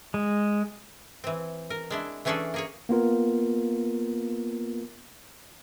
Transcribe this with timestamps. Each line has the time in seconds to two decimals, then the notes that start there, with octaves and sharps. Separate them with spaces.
0.14 G#3
1.24 E3 C4
1.70 A#4
1.90 G#3 D4 E4
2.25 E3 A3 C#4 D4 G#4 A4
2.54 A#3 G#4 C#5
2.89 A#3 B3 F4 A#4